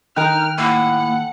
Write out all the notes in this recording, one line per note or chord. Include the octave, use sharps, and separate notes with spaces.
D#3 D#4 A#4 G5 F6 F#6
A2 A#3 F#5